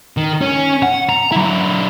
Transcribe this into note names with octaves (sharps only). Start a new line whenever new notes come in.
D#3
C#4
F#5
A#5
F#3 E4